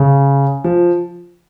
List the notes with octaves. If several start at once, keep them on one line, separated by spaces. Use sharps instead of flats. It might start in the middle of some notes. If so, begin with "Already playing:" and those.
Already playing: C#3
F3